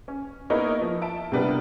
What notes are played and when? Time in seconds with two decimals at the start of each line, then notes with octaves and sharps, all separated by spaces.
0.08 C#4
0.50 A#3 B3 D#4 E4 A#4 C#5
0.81 F3
1.02 E5 A5 D7
1.32 C3 G3 B3 D4 A#4